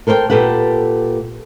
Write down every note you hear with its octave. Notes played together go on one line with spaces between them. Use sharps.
A4 A#4 C5 C#5 G5
A#2 G4 A4 B4 F#5